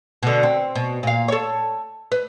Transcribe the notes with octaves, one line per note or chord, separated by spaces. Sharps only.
B2 D3
C4
B2
A#2 F5
A4 C#5
B4